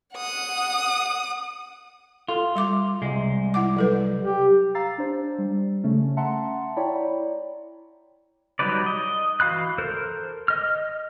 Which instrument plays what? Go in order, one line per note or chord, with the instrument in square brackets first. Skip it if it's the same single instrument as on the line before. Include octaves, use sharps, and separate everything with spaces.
[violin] F#5 D#6
[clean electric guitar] F4 [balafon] A4
[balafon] G3 E5 D6
[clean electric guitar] C2 G#3
[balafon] E4 F#5 D6
F#3 A4 B4
[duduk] G4
[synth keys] F5 A#5 E6 A6 C7
D4 C5
G3
C#3 A3 C#4
E5 F#5 A5 A#5 C6 C#7
E4 C#5 D5 G5 A#5 B5
[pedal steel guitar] F#3 G3 D#4 B4 D5
D#5
E3 F#4 F5 B5 F#6
A4 A#4 C5
D#5 F6